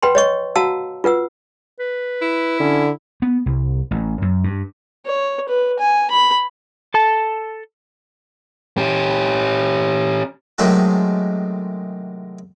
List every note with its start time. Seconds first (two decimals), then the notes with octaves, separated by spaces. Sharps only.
0.03 B4 F#5 G5 B5 C6
0.15 C#5 D#5 C#6
0.56 F#4 F5 F#5 A5 A#5 E6
1.04 F4 B4 F#5 E6
1.80 B4
2.22 E4
2.60 D3 C#4
3.22 B3
3.46 C2
3.91 A1
4.22 F#2
4.44 G2
5.06 C#5
5.49 B4
5.79 G#5
6.11 B5
6.94 A4 A5
8.78 C#4 G4
10.58 A2 C3 D#3 F#3 G#3 A4